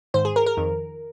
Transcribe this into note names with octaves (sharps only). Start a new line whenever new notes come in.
G#2 D#3 C5
G#4
A#4
A#4
F2 D#3